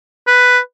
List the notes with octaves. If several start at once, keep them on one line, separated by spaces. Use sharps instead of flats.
B4